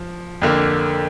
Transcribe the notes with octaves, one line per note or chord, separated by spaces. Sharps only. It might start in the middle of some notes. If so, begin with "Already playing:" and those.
Already playing: F3
F2 D3 A#3